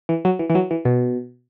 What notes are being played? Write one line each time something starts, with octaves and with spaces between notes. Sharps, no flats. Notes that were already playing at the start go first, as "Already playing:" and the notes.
E3
F#3
E3
E3
F#3
E3
B2